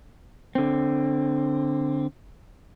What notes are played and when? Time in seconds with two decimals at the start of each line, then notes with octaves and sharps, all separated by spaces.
0.55 D3 C4